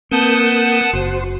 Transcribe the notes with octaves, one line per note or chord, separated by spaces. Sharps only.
A#3 C4 B4 F#5 A5 D#6 G6
F#1 F#4 C5